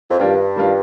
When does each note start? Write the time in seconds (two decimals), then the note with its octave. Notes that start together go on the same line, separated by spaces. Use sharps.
0.11 F2
0.19 G2 D#3 G3 D4 F4
0.56 D#3 G3 D4 F4